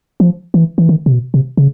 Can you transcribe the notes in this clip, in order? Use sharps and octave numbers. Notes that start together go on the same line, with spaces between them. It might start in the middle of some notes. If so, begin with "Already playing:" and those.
F3
E3
E3
D#3
C3
B2
C3
C#3